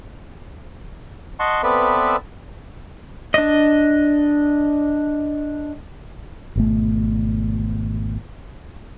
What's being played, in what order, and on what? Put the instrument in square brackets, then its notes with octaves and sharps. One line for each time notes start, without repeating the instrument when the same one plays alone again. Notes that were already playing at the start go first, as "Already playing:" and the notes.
[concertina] D#5 F#5 A5 C6 C#6
B3 C4 A4 B4 D5 E5
[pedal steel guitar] D4 D#5
[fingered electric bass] G#1 B2 A3